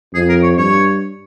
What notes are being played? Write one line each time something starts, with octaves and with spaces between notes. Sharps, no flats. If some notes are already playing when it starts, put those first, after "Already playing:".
F2 G#4
A#4
C#5
G2 C#5